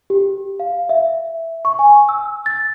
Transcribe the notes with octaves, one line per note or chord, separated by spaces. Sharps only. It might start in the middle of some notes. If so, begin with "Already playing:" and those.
G4
F5
E5
C#6
G#5
E6
A6